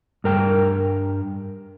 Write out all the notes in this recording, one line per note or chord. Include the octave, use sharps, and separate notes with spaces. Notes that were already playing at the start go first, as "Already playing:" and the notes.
G2 A#4 G5